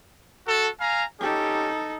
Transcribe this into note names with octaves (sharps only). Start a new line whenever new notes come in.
F#4 A4
F5 G#5 A#5
C#4 D#4 G4 A4